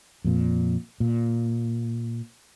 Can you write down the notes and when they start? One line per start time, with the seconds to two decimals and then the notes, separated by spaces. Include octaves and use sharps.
0.25 F2 A#2
1.00 A#2